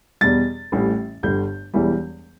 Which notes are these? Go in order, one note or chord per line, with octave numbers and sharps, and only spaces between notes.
E2 B2 G3 A6
A1 A2 E3 G3
G1 G2 D3 G3 G6
E1 E2 E3 G3